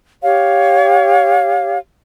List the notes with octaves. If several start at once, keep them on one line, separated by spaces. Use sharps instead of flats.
G4 C#5 F5